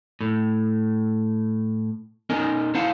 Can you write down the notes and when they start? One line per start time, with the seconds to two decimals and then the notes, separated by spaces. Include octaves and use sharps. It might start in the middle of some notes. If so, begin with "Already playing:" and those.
0.21 A2
2.30 C#4 D#4 A#4 D#5
2.74 E4 C5 F5 F#5 A5